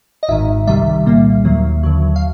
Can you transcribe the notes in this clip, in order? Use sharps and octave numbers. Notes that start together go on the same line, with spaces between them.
D#5
G#1 G#2 D#3 E5
C2 C3 D#3 G3 E5
C2 A#2 G3 A#3
D#2 D#3 F#3 A#3
D#2 D3 F#3
F5